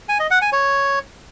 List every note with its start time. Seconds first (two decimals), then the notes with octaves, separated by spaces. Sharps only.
0.09 G#5
0.20 D#5
0.31 F#5
0.42 G#5
0.53 C#5